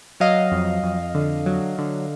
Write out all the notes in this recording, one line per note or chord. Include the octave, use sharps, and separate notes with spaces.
F#3 D#5 F5
F2
F2
D3
F#3
D3